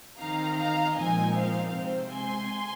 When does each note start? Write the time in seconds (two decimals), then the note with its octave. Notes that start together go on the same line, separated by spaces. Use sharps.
0.18 D#3 C4 D#4 F5 A#5
0.57 F5 A#5
0.96 A#2 F3 G#3 C4 D#4 D#5 G#5
1.34 C5 F5
1.74 C3 G#3 C4 C5
2.12 G#5 C6